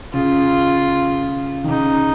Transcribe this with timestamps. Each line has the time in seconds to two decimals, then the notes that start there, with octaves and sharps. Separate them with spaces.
0.13 C#3 F4
1.64 D#3
1.68 C#3 D#4